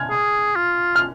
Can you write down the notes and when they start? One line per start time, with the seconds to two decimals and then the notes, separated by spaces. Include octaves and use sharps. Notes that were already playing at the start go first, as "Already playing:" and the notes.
Already playing: F6 G#6
0.10 G#4
0.56 F4
0.96 F6